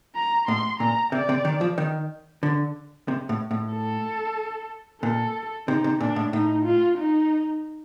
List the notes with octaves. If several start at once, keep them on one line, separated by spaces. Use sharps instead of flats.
A#5
A2 C6
A#2 A#5
C3 D5
C3
D#3
F3
D#3
D3
C3
A2
A2
A4
A#2 A4
C3 D#4
C3
A#2 D4
A2
A2 D#4
F4
D#4